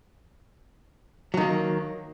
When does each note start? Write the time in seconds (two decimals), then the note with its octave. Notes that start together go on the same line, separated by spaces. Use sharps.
1.34 F#3
1.37 D#3
1.41 A#3